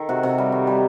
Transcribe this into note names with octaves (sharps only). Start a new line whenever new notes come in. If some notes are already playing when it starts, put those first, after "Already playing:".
Already playing: D#3 A4
C3 F#4
C3
G3
D#3
G3